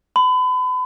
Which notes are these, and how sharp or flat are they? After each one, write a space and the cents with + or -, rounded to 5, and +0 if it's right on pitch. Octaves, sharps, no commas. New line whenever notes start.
B5 +35